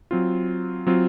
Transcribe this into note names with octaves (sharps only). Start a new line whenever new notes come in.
F#3 C4 F4
F#3 C4 F4